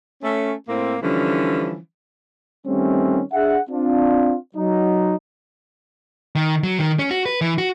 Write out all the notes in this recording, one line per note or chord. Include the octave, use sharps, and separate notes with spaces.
A3 C#4
A2 A#3 C4
D3 E3 F3 G3 C#4
D#3 G3 A3 C4 C#4
D4 G#4 E5 F#5
C4 D4 F4
F#3 D#4
D#3
F#3
D#3
C#4
F#4
B4
E3
F#4